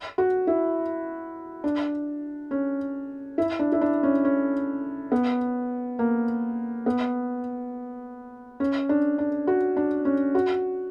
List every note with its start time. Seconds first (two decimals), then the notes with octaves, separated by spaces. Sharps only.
0.18 F#4
0.47 E4
1.64 D4
2.51 C#4
3.38 E4
3.59 D4
3.72 E4
3.81 D4
4.03 C#4
4.25 C#4
5.12 B3
5.99 A#3
6.86 B3
8.60 C#4
8.89 D4
9.18 D4
9.47 F#4
9.77 D4
10.05 C#4
10.35 F#4